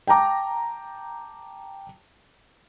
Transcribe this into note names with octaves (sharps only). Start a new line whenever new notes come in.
G5 A5 A#5 D6